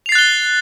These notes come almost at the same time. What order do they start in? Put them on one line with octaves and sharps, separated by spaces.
F7 C7 A6 F#6 G7